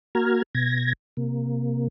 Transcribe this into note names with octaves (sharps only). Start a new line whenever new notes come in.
A#3 F#4 A#5 F6 G#6
B2 G#6 A#6
C3 A#3